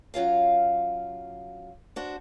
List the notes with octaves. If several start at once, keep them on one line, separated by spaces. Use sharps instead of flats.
F#3 C#4 F4 F5
D4 F#4 C5